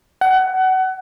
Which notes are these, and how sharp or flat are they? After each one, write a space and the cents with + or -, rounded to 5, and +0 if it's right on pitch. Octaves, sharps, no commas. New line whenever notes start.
F#5 +25